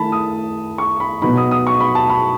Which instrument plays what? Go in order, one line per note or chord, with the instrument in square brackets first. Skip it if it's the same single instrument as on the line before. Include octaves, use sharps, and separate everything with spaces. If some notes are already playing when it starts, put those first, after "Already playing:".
Already playing: [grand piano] D#3 A3 E4 A5 B5
D#6
C#6
B5
B2 F#3 B3 D#4 B5
D#6
D#6
C#6
B5
A5
B5